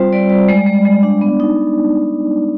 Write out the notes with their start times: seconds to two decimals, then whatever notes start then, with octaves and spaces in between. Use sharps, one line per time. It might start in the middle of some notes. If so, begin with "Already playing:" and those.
Already playing: G3 C4 F4 C5
0.13 G3 D5
0.30 G3
0.49 G#3
0.66 G#3
0.85 G#3
1.03 D4
1.21 B3
1.40 D#4